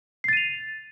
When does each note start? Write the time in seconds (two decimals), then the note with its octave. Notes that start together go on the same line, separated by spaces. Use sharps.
0.24 C7
0.28 A6
0.33 D#7
0.37 F7